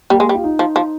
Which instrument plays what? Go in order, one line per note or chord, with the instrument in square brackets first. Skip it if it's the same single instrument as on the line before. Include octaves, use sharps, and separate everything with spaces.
[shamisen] G3 [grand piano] A#3
[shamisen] G#3
G3
[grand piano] F4
D#4
[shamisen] F3
F3